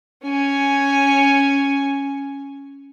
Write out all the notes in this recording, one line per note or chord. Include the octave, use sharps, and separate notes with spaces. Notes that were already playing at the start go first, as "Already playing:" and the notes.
C#4 G#5